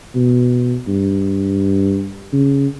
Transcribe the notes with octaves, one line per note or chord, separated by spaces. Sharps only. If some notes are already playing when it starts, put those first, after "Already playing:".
B2
G2
C#3